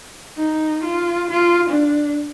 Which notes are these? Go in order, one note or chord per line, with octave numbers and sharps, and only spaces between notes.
D#4
F4
F4
D4